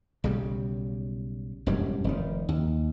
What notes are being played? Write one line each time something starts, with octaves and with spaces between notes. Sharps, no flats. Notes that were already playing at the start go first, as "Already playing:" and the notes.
B1 C#3 G3
E1 F#2 A2 G3
F1 D#3
D#2